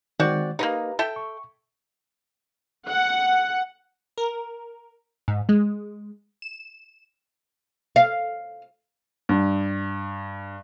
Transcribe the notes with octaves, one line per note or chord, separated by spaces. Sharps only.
D#3 G#3 C4 F#4 D5
A#3 B3 D#4 G4 B4 A#5
A4 E5 G5
C#6
F#5
A#4
G#2
G#3
E7
F5
G2